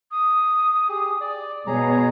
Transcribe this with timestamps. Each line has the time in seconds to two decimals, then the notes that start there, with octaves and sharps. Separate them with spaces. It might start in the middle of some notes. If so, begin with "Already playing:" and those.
0.11 D#6
0.89 G4 G#4
1.21 D5
1.67 B2 G#4 C#5 A#5